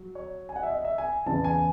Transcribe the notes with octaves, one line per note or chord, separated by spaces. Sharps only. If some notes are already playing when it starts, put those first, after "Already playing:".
Already playing: F#3
C#5
G#5
F#5
E5
D#5
E5
G#5
E2 C#3 E3 B3 A5
G#5